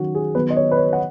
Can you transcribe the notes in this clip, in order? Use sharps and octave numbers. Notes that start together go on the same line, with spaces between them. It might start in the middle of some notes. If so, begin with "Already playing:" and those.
Already playing: D#3 F#3 C#4 F#4
G#4
D#3 F#3 B3 B4
D#5
C#5
B4
C#5
F#5